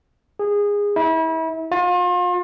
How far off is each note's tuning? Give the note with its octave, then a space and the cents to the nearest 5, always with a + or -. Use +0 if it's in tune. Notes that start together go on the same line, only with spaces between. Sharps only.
G#4 -20
E4 -35
F4 +35